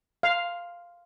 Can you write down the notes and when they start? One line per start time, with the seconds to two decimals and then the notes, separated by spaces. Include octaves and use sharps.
0.23 F5